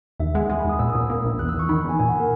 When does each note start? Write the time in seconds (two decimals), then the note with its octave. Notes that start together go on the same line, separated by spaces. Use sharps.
0.20 D#2 E5
0.35 G#3 F#5
0.50 G#3 G#5
0.60 B5
0.65 D#2 D#6
0.79 A#2 E6
0.90 D#6
0.95 A#2 E6
1.10 A#3
1.24 A#1
1.39 E2 F#6
1.49 E6
1.54 E2 C#6
1.69 D#3 B5
1.84 E2 G#5
1.99 A#2 G#5
2.09 F#5
2.20 A#4